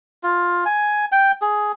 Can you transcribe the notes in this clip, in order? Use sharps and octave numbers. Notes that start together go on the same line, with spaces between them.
F4
G#5
G5
G#4